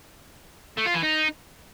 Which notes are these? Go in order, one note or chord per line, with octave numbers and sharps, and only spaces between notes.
A3
F4
E3
D#4